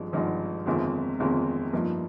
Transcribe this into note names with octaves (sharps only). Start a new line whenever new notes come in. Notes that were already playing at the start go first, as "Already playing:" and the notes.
Already playing: G#1 G2 F3 G#3 D#4
G#1 G2 F3 G#3 D#4
G1 F2 C3 D#3 G#3
G1 F2 C3 D#3 G#3
G2 F3 A#3 D#4